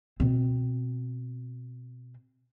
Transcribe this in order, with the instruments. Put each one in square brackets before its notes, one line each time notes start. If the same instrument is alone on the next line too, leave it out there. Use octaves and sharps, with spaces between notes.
[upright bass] B2 C4